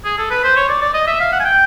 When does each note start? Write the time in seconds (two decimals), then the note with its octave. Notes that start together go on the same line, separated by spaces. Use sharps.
0.05 G#4
0.18 A4
0.30 B4
0.44 C5
0.56 C#5
0.69 D5
0.82 D5
0.94 D#5
1.07 E5
1.20 F5
1.32 F#5
1.40 G#5
1.45 G5